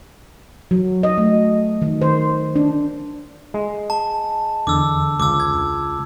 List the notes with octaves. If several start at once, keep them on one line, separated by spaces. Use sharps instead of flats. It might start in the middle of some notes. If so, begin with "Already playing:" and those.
F#3
D#5
A3
D#3
C5
D4
G#3
A5
E2 D3 D6 E6
C#2 D6 E6
G#6